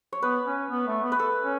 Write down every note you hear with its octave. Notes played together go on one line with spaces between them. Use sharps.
C#5
B3 B4
C#4
B3
A3
B3
B4
A4
C#4